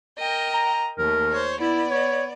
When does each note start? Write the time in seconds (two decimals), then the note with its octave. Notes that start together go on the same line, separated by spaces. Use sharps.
0.18 A#4 D#5 G5
0.54 A#5
0.98 D#2 A3 A#4
1.32 C5 C#5
1.61 B3 E4 D5
1.91 C#5